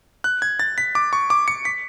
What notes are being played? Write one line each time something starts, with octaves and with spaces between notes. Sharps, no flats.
F#6
G#6
A6
B6
D6
C#6
D6
C#7
B6